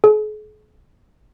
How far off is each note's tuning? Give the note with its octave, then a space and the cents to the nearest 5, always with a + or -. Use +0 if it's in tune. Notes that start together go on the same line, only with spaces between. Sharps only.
G#4 +45